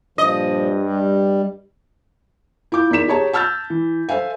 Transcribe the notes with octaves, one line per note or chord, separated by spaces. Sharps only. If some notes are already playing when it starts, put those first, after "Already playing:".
G2 A#2 F3 D#5
G3
E4 F4 D6 G6
E2 D#4 A#4 B6 E7
G4 G#4 C#5 A5 A#5
A5 E6 F6 G6 A6
E3
A4 C5 E5 F5 G#5